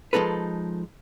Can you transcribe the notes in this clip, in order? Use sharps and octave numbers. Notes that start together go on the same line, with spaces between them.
F3 G#3 D#4 A4 B4